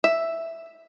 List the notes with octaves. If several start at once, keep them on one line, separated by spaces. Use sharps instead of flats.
E5